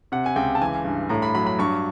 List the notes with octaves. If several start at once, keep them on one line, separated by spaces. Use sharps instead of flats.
C3 F#5
G#5
C#2 G5
A5
E3 G#5
G2
A2 A#5
B5
F#3 B5
B5
G2 C#6